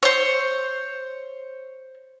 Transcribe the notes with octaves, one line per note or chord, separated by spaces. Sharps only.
C5 C#5